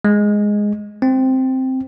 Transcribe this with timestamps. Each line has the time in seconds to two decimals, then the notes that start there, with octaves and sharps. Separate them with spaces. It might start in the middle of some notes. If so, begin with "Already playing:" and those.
0.05 G#3
1.02 C4